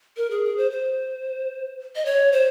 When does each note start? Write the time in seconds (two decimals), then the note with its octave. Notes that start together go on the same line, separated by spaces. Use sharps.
0.17 A#4
0.31 G#4
0.44 G#4
0.57 C5
0.71 C5
1.96 D#5
2.06 C#5
2.32 C5